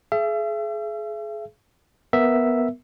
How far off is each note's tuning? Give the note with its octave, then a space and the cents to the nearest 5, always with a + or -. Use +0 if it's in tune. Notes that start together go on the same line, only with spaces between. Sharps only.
G#4 +35 E5 +40
B3 +0 A#4 +0 E5 +0